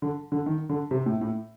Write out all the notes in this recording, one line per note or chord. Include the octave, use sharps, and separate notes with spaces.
D3
D3
D#3
D3
C3
A2
A2